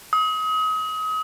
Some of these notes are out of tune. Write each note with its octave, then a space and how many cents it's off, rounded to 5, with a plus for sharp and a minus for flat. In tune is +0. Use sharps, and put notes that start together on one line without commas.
D#6 +35